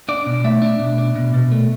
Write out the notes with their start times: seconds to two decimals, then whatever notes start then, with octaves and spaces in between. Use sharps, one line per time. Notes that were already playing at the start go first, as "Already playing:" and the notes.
0.09 D4 D5
0.26 B2
0.44 A3 E5
0.62 D4
0.79 B2
0.98 D4
1.15 B2
1.34 B2
1.52 A3